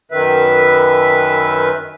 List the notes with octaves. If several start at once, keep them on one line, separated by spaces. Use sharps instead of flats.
F#2 D#3 B4 E5